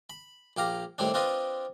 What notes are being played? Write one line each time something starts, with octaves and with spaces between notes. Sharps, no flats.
B5
A#1 G4 F5 A#5
D#2 A2 G3 C4 D4
C4 D4 F4 B4 D#5 C6